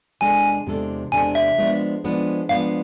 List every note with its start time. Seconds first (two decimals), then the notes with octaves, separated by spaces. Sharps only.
0.21 E2 C3 G#3 D4 A4 G#5
0.67 E2 C3 G#3 D4 A4
1.12 E2 C3 G#3 D4 A4 G#5
1.35 E5
1.58 F3 G#3 B3 D4
2.04 F3 G#3 B3 D4
2.49 F3 G#3 B3 D4 F5